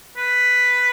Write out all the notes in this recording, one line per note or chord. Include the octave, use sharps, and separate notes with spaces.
B4